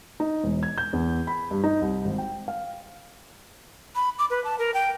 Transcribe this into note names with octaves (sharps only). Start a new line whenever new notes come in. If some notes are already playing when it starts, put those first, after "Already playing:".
D#4
E1
G#6
G6
E2
B5
G2
D#4
C2
G#1
G5
F5
B5
D6
B4
A5
A#4
G5